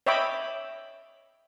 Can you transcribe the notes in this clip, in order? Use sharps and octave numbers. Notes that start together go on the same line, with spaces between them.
C#5 D#5 E5 G5 B5 D6